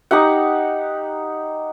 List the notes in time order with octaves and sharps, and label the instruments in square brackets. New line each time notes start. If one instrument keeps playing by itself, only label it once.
[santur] D#4 G4 F#5